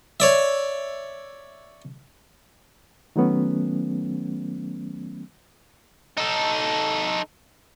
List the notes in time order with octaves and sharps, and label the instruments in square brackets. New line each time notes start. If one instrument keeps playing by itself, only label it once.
[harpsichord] C#5 D5 E5
[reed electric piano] D#3 F#3 A3 B3 C#4
[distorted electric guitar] D#4 A4